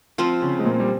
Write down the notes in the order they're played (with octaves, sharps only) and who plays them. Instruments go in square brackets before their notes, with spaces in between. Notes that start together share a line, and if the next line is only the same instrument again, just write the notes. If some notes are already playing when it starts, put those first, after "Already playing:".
[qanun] F3 C4 F4
[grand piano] C#3 C#4
G#3
A#2 A#3
G3